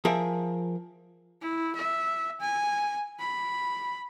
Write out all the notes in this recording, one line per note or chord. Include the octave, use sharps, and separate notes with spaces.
F3 G#4 A#4 E5
E4
E5
G#5
B5